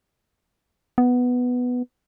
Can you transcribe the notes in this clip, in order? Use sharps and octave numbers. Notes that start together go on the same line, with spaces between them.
B3